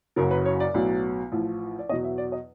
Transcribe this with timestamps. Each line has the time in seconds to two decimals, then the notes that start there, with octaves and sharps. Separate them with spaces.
0.16 F#1 F#2 C#3 F#3 A#4
0.31 B4
0.45 C#5
0.60 D5
0.74 B1 A2 F#3
1.32 A1 A2 F3
1.79 D5
1.89 E2 B2 F#3 D#5
2.04 E5
2.18 D5
2.32 D#5